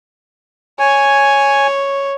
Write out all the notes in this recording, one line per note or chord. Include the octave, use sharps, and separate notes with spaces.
C#5 G#5